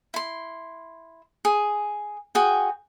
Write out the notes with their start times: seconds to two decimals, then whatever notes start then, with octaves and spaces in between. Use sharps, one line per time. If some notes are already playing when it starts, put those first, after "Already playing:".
0.14 E4 C6
1.45 G#4
2.35 F#4 G#4 G5